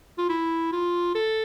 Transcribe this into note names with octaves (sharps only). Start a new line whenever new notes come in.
F4
E4
F4
A4